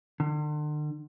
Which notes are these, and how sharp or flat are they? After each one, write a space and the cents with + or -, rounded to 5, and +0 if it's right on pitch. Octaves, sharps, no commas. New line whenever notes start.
D3 +40